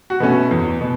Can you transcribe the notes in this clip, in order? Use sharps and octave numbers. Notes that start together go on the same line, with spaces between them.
F#4
B2 A3 C#4
E2
B2